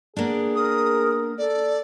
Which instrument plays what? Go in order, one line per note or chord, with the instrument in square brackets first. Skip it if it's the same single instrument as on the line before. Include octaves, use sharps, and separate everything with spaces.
[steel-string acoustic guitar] A#3 B3 D4 [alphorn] G#4
[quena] A#4 [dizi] D#6
[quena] A4 [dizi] D5